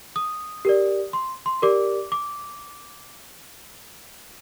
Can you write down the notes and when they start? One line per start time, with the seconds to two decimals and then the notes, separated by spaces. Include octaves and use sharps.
0.16 D#6
0.65 G4 A#4 D5
1.13 C6
1.46 C6
1.62 G4 A#4 D5 D6
2.12 D6